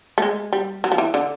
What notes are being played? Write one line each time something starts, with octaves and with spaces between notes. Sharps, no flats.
A3
G#3
G3
F#3
F3
E3
D3